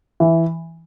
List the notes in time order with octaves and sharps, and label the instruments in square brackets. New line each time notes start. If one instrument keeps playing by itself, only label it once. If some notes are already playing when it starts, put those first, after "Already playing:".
[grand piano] E3